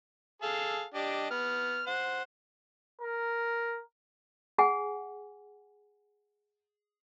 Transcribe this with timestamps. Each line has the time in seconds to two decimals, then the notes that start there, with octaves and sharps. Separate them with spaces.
0.42 G#4 A4 F5
0.94 D4 G4 D#5
1.31 B3 F6
1.86 C5 F#5
3.01 A#4
4.58 G#4 F#5 G#5